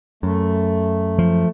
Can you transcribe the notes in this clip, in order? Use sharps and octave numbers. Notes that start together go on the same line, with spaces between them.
F#2 A3
F3